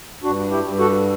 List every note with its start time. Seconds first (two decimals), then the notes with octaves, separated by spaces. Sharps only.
0.23 G2 D4 F#4
0.51 E4 G4
0.65 G2
0.78 F#4 A4